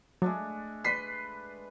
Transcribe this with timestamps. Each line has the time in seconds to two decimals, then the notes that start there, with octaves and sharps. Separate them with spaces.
0.22 F#3 G#3 A3 D4
0.84 B4 C6 B6 C7